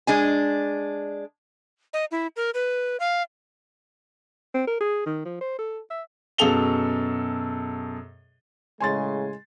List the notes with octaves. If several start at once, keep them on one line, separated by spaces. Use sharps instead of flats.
G#3 D4 G#5
D#5
E4
A#4
B4
F5
C4
A#4
G#4
D#3
F3
C5
A4
E5
F#2 B2 G#4 A4 F7 G7
A2 C#3 G#3 G#5 C6 A6